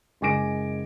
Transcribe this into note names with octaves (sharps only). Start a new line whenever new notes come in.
F#1 G#3 G#5 D6 A#6 D7